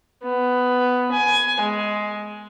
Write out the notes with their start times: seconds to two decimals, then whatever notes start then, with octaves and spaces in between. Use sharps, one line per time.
0.23 B3
1.11 G#5
1.61 G#3